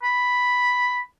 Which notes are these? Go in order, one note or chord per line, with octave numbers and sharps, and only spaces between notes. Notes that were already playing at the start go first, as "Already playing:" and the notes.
B5